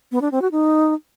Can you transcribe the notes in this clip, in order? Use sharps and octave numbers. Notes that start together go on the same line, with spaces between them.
B3
D4
C4
F#4
D#4